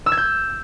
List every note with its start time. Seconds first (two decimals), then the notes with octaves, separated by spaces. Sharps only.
0.06 E6
0.12 G#6
0.17 G6